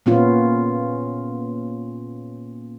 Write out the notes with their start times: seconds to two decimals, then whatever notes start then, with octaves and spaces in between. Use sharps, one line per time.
0.06 A#2 B3 C#4 F4